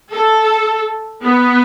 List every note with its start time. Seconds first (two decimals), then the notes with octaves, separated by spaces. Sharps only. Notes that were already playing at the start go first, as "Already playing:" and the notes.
0.10 A4
1.22 B3